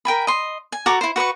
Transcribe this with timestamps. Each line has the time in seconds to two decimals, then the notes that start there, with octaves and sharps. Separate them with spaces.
0.05 A#4 G5 G#5 B5
0.27 D#5 C6
0.72 G#5
0.86 F#4 A4 A#5 D6
1.01 E4 C5
1.16 F#4 B4 B5 C#6